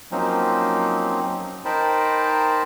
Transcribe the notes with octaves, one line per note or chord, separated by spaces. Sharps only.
F3 F#3 A#3 C4 C#4 D#4
D#4 A#4 C5 G5 A5 B5